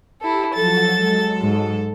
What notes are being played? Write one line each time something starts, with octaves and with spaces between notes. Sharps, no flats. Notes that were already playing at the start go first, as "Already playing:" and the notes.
E4 G4 A4
F3 F#3 F#4 A4 A6
F#3 G#3
G#2